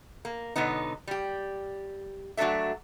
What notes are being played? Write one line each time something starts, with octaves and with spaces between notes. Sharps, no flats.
A#3
B2 D3 F#3 B3 D#4
G3 G4
F#3 A3 D4 F#4 A4 E5